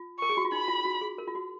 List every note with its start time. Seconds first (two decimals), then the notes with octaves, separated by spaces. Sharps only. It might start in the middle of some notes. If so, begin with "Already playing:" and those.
Already playing: F4
0.19 A#4 C#6
0.30 G#4
0.37 F#4
0.45 F4
0.52 D#4 B5
0.68 F4
0.85 F#4
1.01 G#4
1.18 A#4
1.28 F4
1.35 F#4